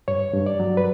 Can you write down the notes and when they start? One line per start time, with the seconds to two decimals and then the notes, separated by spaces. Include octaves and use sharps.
0.08 G2 C#5
0.33 G2
0.46 D5
0.60 F#3
0.77 B4